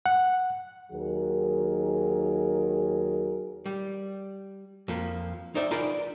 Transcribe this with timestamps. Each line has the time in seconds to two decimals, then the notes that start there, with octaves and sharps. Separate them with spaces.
0.06 F#5
0.92 D#2 D#3 F#3 G#4 A#4
3.66 G3
4.88 F2 F3 A#3
5.55 D#4 C5 D5 E5
5.71 D#4 F4 G#4 A#4 B4 D5